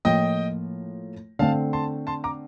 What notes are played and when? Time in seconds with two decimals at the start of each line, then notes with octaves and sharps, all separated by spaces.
0.05 A2 F3 A#3 F4 D#5 G5
1.39 D3 A3 C4 F5 A5
1.73 A5 C6
2.07 A5 C6
2.24 A#5 D6